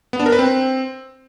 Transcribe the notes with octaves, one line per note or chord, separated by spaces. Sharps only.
B3
D4
A#4
B4
C4